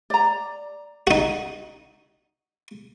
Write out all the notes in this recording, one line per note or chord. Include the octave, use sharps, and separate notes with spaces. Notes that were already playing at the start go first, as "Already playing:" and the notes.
D5 A#5
D#4 F#4